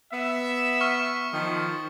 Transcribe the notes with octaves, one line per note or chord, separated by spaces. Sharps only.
B3 E5
C#6 F6 C#7
D#3 F3